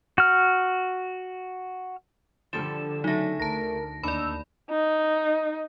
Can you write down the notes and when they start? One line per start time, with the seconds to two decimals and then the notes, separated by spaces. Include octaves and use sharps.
0.18 F#4 F6
2.53 D3 F3 G3 A4 E7
3.04 C#3 F#3 A3 D#4 A#6
3.40 D2 A#4 A5 A#6
4.03 D#2 D4 D#4 D5 B5 E6
4.71 D#4